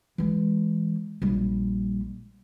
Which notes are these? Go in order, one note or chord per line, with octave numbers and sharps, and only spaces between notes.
E3 G#3
A#1 G3